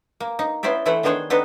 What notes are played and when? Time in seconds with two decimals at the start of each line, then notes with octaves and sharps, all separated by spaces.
0.20 A#3
0.39 D#4
0.63 B3 C#4 E4 C5 D5 E5
0.86 E3 A3 E4 A4 C5 F#5
1.03 D#3 B3 D4 G#4 C5 C#5
1.30 B3 C4 D4 D#4 A4 B4